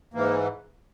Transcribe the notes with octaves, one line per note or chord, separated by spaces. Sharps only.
G#2 E3 A#3